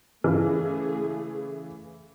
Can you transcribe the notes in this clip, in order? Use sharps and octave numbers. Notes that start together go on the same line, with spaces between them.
C#3 E3 A3 G#4